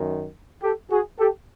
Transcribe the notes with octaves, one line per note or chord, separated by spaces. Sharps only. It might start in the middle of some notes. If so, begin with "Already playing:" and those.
Already playing: F#2 D#3
G4 A4
F#4 G#4
G4 A4